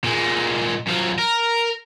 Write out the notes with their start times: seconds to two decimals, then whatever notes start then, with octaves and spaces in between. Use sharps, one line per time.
0.04 A#2 G#3
0.87 F#2 F3
1.19 A#4